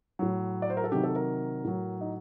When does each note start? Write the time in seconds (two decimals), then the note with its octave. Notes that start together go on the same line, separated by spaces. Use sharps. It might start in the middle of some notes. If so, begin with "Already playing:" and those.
0.19 A2 F#3
0.62 D5
0.70 C5
0.77 A#4
0.84 A4
0.92 C3 D#3 F#3 G4
1.03 A4
1.16 A#4
1.64 A2 F#3
2.01 D#4